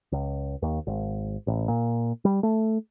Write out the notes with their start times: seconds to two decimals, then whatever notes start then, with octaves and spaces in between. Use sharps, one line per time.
0.12 C#2
0.62 D#2
0.87 G#1
1.47 A1
1.68 A#2
2.25 G3
2.43 A3